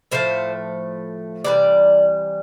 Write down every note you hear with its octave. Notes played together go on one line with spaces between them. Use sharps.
A2 F3 A3 C5
C3 E3 G3 D5